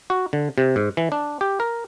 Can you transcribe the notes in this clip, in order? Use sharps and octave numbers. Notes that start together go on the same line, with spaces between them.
F#4
D3
C3
G#2
E3
D4
G4
A#4